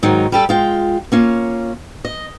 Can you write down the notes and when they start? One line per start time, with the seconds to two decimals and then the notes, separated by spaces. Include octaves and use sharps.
0.03 G#2 D#3 F#3 D#4
0.32 G3 G4 A4
0.49 G#3 F4 G5
1.12 A#3 C#4 F4
2.05 D#5